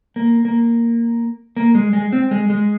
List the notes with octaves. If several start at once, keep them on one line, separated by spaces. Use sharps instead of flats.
A#3
A#3
A#3
G#3
G#3
C4
G#3
G#3